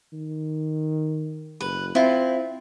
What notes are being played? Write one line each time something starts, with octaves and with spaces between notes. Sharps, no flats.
D#3
F#1 B4
C4 E4 F4